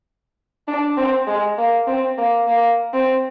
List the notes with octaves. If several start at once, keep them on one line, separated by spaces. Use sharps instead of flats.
D4
C4
G#3
A#3
C4
A#3
A#3
C4